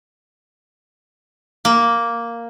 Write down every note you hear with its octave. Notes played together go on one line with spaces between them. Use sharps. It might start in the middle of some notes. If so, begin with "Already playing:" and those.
A#3